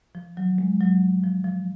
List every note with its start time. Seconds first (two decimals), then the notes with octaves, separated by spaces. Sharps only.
0.15 F3
0.37 D#3 F#3
0.58 G#3
0.80 G#2 F#3
1.23 D#3 F3
1.44 F3